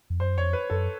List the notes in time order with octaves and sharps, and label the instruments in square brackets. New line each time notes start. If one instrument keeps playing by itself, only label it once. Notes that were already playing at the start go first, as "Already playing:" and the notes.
[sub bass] F2
[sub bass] F#2 [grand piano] C5
[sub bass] F2 [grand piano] C#5
[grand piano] B4
[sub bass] F#2 [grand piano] A4